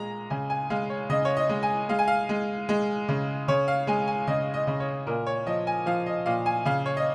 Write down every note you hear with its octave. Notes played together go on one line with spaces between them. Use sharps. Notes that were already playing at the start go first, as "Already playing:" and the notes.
Already playing: A#2 G#3 A#5
C#3 G#5
G#5
G#3 F5
C#5
C#3 D#5
C#5
D#5
G#3
G#5
G#3 F5
G#5
F5
G#3
G#3
C#3
C#3 C#5
F5
G#3 G#5
G#5
C#3 D#5
D#5
C#3
C#5
A#2 A#4
C#5
F3 D#5
G#5
F3 F5
D#5
A#2 F5
G#5
C#3 F5
C#5
D#5